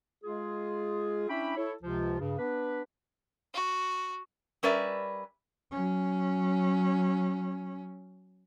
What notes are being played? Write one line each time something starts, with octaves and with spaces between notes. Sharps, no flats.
G#3 F4 G#4
C#4 D4 E4 E5 G5 B5
E4 A4 C#5
C#2 C3 F3 F4
G2 C#3
B3 D4 B4
F#4
G3 C#4 A#4 B4 D5 E5
F#3 C#4